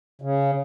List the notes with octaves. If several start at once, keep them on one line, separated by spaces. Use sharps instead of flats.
C#3